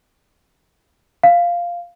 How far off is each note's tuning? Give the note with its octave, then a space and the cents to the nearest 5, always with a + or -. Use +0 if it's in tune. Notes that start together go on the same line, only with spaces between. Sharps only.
F5 -5